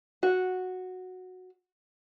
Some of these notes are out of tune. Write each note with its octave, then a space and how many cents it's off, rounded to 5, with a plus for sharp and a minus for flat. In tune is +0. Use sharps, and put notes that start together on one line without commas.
F#4 -5